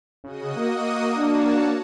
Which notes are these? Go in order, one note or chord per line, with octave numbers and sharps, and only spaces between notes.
C#3 F#4 D#5 D#6
A#3
D4 F#4 C#5 A5